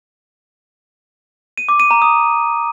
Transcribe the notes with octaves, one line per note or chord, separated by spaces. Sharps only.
D#7
D6
D#7
A#5
D#6